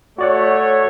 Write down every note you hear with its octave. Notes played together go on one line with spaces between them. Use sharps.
A3 F#4 C#5 D5 F#5